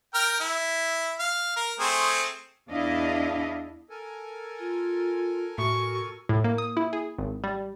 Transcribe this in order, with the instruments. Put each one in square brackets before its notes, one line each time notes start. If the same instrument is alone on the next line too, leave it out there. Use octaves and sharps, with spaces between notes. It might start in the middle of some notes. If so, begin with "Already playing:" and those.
[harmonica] A#4 G5 F6
E4
F5
A#4
A3 C4 G#4
[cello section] E2 D4 E4 D#5 F5
[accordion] A4 A#4 G#5
[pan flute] F4
[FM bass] A2 [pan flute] F#4 [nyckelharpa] C#6
[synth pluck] A2
A#3
D#6
E4
G#4
G#1
G3